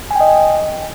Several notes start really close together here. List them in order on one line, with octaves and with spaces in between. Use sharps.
G#5 G5 D#5